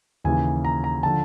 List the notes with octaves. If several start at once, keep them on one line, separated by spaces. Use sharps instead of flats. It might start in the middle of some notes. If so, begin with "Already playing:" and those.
D#2 C#3 E3 G#5
A#5
A#5
D3 F3 A5